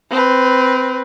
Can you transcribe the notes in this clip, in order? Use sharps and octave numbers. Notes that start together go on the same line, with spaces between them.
C4 B4